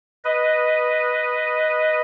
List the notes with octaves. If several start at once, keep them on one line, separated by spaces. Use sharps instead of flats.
B4 D#5